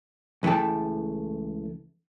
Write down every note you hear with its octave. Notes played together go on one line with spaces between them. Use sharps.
C#2 E3 A3 G5 A5